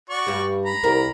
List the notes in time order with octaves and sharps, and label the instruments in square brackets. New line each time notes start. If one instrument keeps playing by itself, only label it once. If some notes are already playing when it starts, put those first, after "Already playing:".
[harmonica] F#4 D5 C#6
[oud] G2 G3
[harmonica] A#5 B5
[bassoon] C2 [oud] A#4